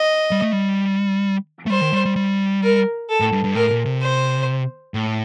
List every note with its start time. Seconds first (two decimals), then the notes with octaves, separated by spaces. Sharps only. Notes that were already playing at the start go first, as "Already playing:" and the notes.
Already playing: D#5
0.31 G3
0.42 A3
0.53 G3
1.66 A3
1.70 G3 C5
1.81 D#3
1.93 G3
2.05 G3
2.16 G3
2.63 A#4
3.09 A4
3.20 A2
3.32 G2
3.44 G2
3.55 A2 A#4
3.71 A#2
3.86 C3
4.02 C5
4.94 A2